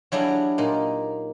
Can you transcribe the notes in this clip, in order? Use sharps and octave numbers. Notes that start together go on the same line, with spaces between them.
F#3 G3 D4 E4 G#4
A#2 D#4